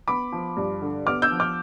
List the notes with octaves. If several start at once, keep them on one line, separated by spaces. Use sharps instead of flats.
B3 B5 D6
F3
G2
D3
B3 D6 F6
E6 G6
F3
D6 F6